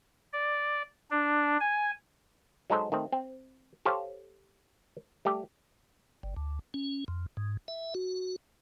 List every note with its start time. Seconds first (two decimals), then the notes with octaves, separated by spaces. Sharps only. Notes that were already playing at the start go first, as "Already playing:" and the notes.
0.33 D5
1.10 D4
1.60 G#5
2.70 F#3 G#3 D#4 A4 C5
2.92 D#3 A3 C4
3.12 C4
3.85 G4 A4 C5 C#5 F5 A5
5.25 G3 A3 G4
6.23 G1
6.37 D2
6.74 C#4
7.08 F2
7.37 G#2
7.68 E5
7.95 F#4